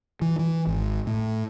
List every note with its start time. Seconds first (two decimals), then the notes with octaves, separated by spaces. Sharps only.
0.22 E3
0.39 E3
0.67 G#1
1.07 A2